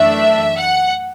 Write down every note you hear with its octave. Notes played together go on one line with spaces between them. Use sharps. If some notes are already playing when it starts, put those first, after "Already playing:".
Already playing: F#2 E3 A3 D4 E5
F#5